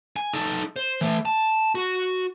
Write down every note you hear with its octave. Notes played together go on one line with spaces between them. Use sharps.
G#5
D#4 A4
C5
E3 A3
A5
F#4